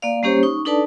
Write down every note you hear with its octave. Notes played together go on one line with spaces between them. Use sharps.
A#3 D5 F5
G3 A#3 C#4 G4 C5 C#5
D#4 C#6
D4 D#4 A4 B4 D5 A5